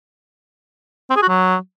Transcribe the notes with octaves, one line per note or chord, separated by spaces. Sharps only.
C4
G#4
F#4
F#3